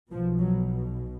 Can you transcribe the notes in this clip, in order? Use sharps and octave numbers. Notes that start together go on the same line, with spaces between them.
B1 B2 F3
F#3